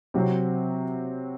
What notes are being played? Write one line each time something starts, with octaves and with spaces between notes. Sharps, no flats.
C3 F#3 C4